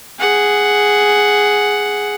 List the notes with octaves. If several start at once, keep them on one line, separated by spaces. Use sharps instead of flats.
G#4 F#5